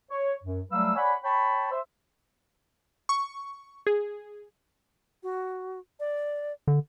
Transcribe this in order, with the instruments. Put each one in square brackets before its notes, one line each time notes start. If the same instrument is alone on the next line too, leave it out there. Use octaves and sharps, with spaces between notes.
[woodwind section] C#5
F#2
F#3 G3 A3 B4 F5 E6
C#5 D5 F#5 G#5 B5
C#5 G5 A5 B5
C5 E5
[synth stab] C#6
G#4
[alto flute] F#4
D5
[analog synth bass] D3